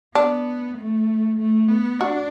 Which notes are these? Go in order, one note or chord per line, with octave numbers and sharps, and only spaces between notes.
B3 D4
A3
A3
B3
D4 F#4